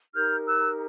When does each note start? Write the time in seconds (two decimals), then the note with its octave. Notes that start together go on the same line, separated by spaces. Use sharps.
0.14 D#4 G4 A#4 F6 G6
0.46 E6 F#6